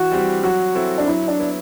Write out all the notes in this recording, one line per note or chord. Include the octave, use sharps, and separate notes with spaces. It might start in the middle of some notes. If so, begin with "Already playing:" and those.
Already playing: E3 F#4
G3 C4 G4
F#3 F#4
C4 E4 A4
D4
F#3 E4
D4
B3 E4